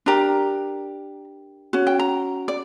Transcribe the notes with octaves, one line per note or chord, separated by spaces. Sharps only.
D4 G4 A#4 A#5
C#4 F#4
G5
A#5
D5